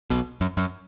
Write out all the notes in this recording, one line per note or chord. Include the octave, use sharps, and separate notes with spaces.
B1 B2
F#2
F#2